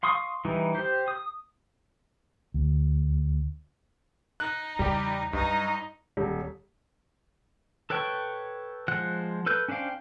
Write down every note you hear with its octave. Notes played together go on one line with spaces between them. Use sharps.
F5 C6 C#6 D#6
E3 G3 D#4
G4 C5
D#6
D2
D#4 F#6
E2 C#3 G3 G4
G2 F#3 G3 D#4 D#5
D#1
A4 B4 C#5 G5 C#6
F3 G#3 C5 F#5 F#6
A4 B4 G6
C#4 D4 C5 F5 G5